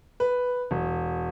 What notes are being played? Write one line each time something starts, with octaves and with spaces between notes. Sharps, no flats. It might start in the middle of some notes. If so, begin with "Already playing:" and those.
B4
E1